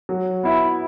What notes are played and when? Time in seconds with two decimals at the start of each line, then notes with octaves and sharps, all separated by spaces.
0.09 F#3
0.43 B3 E4